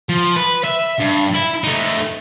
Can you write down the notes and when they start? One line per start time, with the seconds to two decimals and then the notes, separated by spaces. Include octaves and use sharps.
0.09 F3
0.36 B4
0.64 E5
0.99 G2
1.34 E4
1.64 A3 D#4